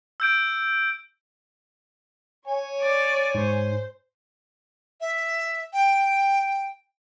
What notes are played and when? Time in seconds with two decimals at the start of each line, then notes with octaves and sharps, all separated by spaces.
0.20 E6 G6 D7
2.47 C#5 G#5
2.81 D5
3.35 G#2 C5
5.01 E5
5.73 G5